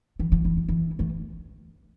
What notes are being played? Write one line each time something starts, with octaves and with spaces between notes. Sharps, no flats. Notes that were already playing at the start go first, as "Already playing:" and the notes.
E3
F3
E3
F3
E3
A3